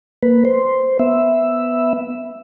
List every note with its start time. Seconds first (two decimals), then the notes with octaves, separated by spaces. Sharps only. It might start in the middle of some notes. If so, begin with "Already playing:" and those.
0.23 A#3 B4
0.45 C5
0.99 B3 E5